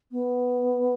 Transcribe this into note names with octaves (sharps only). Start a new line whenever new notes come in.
B3